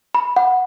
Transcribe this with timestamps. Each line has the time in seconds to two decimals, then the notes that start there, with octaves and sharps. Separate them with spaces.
0.15 B5
0.36 F#5